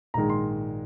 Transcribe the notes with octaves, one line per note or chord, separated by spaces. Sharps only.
A#1 G#2 D#3 G#3 A#5
C6